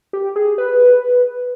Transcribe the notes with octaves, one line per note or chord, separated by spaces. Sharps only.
G4
G#4
B4